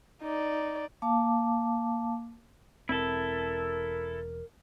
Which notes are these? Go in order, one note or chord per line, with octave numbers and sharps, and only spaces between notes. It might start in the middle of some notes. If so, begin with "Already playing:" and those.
D#4 D5
A#3 F5 A5 D6
E1 C4 E4 A4 A#4